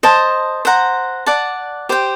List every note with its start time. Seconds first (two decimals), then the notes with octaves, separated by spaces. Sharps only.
0.03 C5 D#5 A5
0.65 C5 F#5 A#5
1.26 D5 F#5 A5
1.89 G4 C5 G5